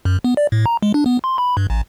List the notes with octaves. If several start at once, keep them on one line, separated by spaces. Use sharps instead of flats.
F#2
B3
D5
A2
A#5
G#3
D4
B3
C6
B5
G2
A1